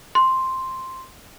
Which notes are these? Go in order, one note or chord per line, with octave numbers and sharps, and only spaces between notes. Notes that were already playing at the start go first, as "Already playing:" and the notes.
C6